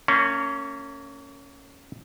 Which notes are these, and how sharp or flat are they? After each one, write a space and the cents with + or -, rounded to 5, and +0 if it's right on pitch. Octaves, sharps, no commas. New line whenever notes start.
A#3 -35 C#4 +0